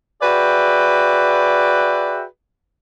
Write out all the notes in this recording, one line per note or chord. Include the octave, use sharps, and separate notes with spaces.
F#4 G#4 B4 D5 E5 G5